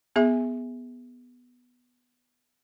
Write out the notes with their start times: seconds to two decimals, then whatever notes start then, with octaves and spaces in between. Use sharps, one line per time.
0.16 B3 G#4 E5 G#5